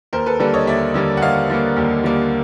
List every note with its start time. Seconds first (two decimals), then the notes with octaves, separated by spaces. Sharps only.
0.13 D#2 A#4 C5
0.26 A4 B4
0.39 D3 G3 A#3 A4 B4
0.54 C#5 D#5
0.67 D#2 D5 E5
0.94 D3 G3 A#3
1.17 F#5
1.21 D#2 D#5 F5
1.50 D3 G3 A#3
1.76 D#2
2.04 D3 G3 A#3